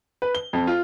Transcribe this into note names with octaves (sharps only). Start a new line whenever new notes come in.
B4
G7
F2
F4